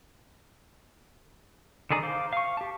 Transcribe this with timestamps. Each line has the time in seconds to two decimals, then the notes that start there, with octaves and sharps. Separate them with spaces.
1.91 D3 D#3 G#4 D5 A#5
2.03 C5 F5 D6
2.33 F5 C#6
2.57 G4 A5